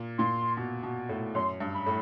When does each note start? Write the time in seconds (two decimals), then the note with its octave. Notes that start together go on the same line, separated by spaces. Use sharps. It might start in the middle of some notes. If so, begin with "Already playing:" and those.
Already playing: A#2
0.18 A#2 C6
0.57 B2
0.83 B2
1.09 A2
1.35 F#2 C6
1.60 G2
1.74 B5
1.86 A2